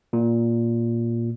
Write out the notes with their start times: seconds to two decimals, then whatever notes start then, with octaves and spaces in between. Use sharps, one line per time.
0.13 A#2